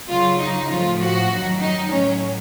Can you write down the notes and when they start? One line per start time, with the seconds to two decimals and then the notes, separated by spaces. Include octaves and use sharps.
0.09 F#2 C#3 F#3 F4
0.40 D#4
0.69 A2 F3 F4
1.00 F#4
1.30 F#2 D#3 F#3
1.61 D#4
1.91 A2 F#3 C#4